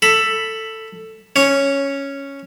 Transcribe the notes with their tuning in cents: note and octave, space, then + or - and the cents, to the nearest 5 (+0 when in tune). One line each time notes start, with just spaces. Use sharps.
A4 +10 B5 +0
C#4 +0 C#5 +0